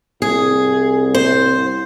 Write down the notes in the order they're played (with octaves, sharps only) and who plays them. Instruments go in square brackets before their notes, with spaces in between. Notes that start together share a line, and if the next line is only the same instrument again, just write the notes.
[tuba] C2 [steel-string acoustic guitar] G#4
[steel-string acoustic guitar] C5